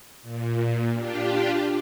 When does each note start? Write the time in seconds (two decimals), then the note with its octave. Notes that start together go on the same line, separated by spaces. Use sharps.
0.22 A#2
0.94 D4 F4 G4